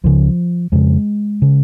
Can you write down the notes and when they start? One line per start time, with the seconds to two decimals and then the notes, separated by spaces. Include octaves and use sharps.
0.04 C#2 C#3 F3
0.72 F2 C#3 G#3
1.42 C#3